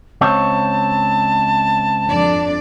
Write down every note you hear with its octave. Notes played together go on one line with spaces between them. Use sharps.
C#2 C4 C#5 A5
F2 D4 D5